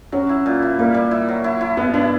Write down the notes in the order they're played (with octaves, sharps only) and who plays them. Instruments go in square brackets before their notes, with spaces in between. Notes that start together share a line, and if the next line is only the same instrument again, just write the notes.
[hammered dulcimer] F#3 [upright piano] C#4
[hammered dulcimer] E4
A#2
E4
[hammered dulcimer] G3 [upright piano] A#3
[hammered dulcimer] G3
E4
F#3
E4
E4
[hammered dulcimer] B2 [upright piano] B3
[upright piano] D4 [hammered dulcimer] E4